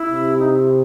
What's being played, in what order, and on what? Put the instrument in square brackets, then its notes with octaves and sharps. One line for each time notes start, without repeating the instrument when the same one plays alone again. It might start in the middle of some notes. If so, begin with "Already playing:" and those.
Already playing: [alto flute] E4
[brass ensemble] C3
[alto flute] D#4
E4